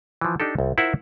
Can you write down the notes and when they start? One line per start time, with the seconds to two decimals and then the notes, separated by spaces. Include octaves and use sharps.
0.21 E3 F3
0.40 D4 D#4 G4 A4
0.59 C2
0.78 E4 F4 A#4 C5 E5 F#5